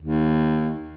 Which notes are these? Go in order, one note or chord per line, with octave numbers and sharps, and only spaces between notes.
D#2